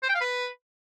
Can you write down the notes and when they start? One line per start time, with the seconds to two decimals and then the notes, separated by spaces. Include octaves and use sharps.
0.03 C5
0.09 G5
0.15 F5
0.21 B4